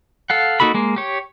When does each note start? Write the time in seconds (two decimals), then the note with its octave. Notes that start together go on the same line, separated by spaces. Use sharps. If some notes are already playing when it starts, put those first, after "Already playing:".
0.30 A4 F5 F#5
0.60 A#3 D#4 F#4 A4 B5
0.74 G#3 A#3
0.96 G4 C#5